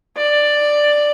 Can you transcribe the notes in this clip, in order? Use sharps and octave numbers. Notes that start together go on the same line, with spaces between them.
D5